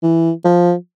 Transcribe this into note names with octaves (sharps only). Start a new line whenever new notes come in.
E3
F3